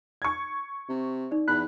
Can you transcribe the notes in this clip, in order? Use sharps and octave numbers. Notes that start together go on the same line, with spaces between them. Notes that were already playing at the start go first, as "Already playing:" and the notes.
C#6 G#6
C3
D#4 D5
E2 B5 F#6